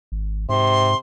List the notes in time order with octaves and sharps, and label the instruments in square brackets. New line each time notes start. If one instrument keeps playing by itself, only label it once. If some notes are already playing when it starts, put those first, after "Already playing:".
[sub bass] G#1
[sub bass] G#2 [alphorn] C3 [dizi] C6